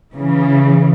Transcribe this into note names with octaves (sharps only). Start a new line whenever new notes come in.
C#3 E3